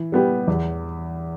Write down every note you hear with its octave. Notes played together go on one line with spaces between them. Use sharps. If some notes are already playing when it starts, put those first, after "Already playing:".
Already playing: E3
G3 B3 G4
E2